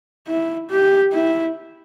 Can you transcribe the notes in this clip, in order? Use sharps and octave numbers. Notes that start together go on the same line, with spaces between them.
E4
G4
E4